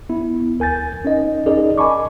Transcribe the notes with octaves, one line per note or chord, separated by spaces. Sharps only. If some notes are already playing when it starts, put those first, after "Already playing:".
B3 E4
D2 A#4 G#5 G6 A6
C#4 D#4 A#4 D#5
C#4 D#4 G#4 A#4 D5 D#5
D#5 G#5 A5 B5 C#6 D6